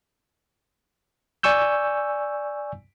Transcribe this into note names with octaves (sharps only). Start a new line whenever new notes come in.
D5 G#5 C#6 E6 G6